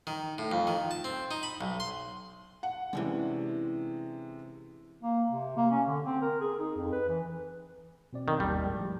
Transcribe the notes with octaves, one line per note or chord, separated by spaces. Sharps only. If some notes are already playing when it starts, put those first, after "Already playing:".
D#3
A2
F2
D#3
A5
C4
D#4
B5
B1
C6
F#5
C3 E3 G#3 C#4 D4
A#3
C3
A#3
C#4
D3
C4
A#4
G#4
D#4
F2
B4
E3
B2 C4 D5
D#3
G1 D#2 G3 A5
A2 F3 G#3